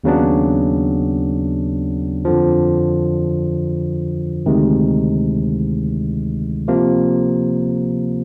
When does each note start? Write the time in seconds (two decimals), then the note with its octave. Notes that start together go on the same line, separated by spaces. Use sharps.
0.04 D#2 C#3 F#3 B3 D4
2.25 F2 D3 F3
4.46 D2 C3 D#3 G#3
6.68 C3 F3 A#3